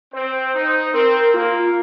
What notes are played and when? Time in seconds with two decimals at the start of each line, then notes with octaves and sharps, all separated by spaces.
0.13 C4 C5
0.54 D#4
0.93 C4 A#4
1.34 A#3 F4